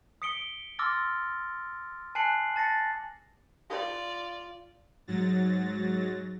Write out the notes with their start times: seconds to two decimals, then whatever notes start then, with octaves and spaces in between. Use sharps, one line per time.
0.22 D#6 B6 C#7 D7 G7
0.79 C6 D6 E6 F6 A6 A#6
2.15 G#5 A5 F#6 C7 C#7 F#7
2.55 G#5 A5 A6 A#6 C#7
3.69 F4 D5
5.07 G#2 F#3 A6 A#6